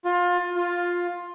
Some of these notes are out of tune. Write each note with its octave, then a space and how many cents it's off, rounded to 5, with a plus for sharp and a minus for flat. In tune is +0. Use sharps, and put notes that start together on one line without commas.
F4 +25
F4 +10